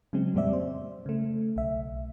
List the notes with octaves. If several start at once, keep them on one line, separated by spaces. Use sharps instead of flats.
C#3 F#3 G#3 C4
F2 A#2 G3 C4 D5 E5
C5
C#3 A3
B1 E5